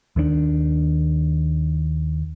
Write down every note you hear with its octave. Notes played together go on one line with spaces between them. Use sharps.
D#2 D#3 B3 D4